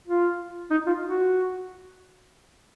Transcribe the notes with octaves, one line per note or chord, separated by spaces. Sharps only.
F4
D#4
F4
F#4